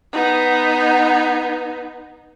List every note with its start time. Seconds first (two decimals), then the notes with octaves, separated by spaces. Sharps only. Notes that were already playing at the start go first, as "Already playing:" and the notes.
0.13 B3 D#4